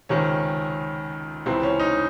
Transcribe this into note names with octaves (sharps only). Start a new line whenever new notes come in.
C#2 C3 D#3 C#4
C#2 C3 E3 C4
C#4
D#4